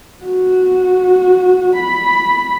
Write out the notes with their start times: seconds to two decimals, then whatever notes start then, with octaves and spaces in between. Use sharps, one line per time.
0.24 F#4
1.76 B5